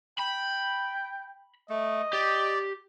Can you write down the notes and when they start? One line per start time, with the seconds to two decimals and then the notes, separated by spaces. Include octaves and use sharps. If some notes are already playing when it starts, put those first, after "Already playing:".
0.19 G5 B5
1.69 A3 D#5
2.13 G4 D5